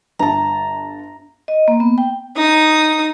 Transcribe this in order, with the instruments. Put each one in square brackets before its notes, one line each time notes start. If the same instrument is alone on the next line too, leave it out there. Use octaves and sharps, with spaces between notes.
[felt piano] G1 A5 [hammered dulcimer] A#5
[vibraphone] D#5
A#3
B3
G5
[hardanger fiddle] D#4 D#6